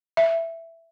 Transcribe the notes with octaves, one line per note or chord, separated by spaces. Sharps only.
E5